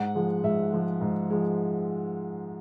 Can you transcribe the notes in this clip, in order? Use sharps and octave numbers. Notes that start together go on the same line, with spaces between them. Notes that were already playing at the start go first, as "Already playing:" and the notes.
Already playing: G#2 F#5
F3 G#3
G#2 E5
F3 G#3
G#2
F3 G#3